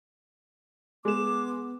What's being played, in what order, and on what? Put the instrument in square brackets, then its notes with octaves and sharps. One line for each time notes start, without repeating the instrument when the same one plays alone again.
[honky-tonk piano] G#3 E7 [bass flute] B3 [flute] D6